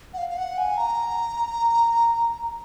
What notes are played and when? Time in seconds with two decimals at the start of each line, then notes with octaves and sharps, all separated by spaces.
0.14 F#5
0.18 F5
0.30 F5
0.37 F#5
0.58 G#5
0.77 A#5